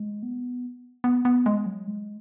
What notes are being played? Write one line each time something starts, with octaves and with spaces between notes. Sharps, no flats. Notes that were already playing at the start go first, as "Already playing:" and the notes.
Already playing: G#3
B3
B3
B3
G#3
F#3
G#3